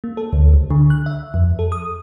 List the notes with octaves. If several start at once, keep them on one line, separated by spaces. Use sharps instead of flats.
A#3
A4
D2
C#2
D3
F#6
E5
F2
A4
D#6